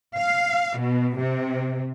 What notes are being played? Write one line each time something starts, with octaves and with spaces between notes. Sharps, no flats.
F5
B2
C3